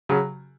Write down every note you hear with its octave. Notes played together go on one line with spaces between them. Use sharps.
C#3 F#3